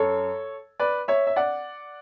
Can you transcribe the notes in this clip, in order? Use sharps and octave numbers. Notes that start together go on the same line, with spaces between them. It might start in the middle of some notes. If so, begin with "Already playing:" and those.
Already playing: F#2 A4 C#5
B4 D5
C#5 E5
E5
D5 F#5